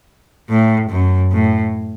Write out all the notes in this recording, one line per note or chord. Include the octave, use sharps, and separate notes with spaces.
A2
F#2
A2